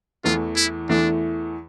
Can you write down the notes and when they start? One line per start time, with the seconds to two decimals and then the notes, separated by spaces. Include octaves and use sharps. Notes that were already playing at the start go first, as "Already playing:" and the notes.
0.24 E2 E3 A3 F4
0.56 E4
0.89 E2 E3 A3 D4